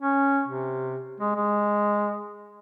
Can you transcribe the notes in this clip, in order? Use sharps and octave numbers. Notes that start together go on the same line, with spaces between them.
C#4
C3
G#3
G#3